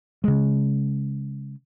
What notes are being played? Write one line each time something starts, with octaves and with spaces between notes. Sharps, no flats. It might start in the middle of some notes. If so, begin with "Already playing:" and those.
C#3 G#3